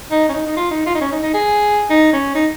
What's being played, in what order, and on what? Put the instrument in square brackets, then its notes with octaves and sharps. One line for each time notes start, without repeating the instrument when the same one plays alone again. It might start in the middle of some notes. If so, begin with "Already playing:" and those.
[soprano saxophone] D#4
C#4
D#4
D#4
F4
D#4
F4
D#4
C#4
D#4
D#4
G#4
D#4
C#4
D#4